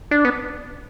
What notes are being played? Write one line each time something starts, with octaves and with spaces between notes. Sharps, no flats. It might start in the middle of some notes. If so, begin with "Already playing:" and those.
D4
B3